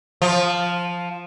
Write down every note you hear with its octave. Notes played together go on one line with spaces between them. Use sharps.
F3 F4